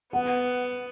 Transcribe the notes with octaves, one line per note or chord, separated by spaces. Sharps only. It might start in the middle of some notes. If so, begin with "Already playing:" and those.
B3 F#5